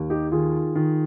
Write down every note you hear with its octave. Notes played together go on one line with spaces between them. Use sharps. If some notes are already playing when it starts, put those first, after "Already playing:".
Already playing: D#2
D#4 G4
D#3 F4 G#4
D#3